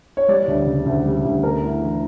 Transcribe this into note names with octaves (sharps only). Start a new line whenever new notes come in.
C#5
G3 D5
D2
C#3
D2
G3
D2
A3 A#4
E4
E3